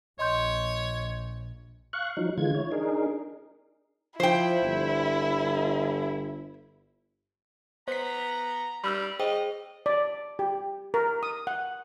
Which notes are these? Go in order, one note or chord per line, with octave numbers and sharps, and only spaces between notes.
A#1 C#5 D#5 C6 G6
F5 C#6 F#6
F3 F#3 D#4
D3 E3 G#3 F4 G#6
E4 C#5
D4 D#4 G#4 A#4
F3 E4 C5 G5
G1
B3 C5 A#5 B6
G3 B5 E6 F6
G#4 C5 D#5 G5
D5
G4
A#4
D#6
F#5